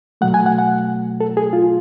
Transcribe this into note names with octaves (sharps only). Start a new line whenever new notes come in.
B2 F#3 A3 F#5
G#5
F#5
F#5
A4
G#4
F4